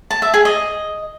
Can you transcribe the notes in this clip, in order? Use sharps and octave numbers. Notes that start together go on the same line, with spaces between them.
A5
E5
G#4
D#5